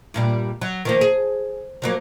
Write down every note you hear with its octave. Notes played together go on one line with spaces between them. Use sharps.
G2 A#2 G3
F#3
D#3 F3 A#3
G#4
F3 F#3 A#3